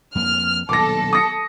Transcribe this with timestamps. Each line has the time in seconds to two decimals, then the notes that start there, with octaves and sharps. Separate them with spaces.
0.15 F2 A#3 F6
0.69 D#1 B1 G2 A4 D6 A#6
1.13 D#6 A#6 C#7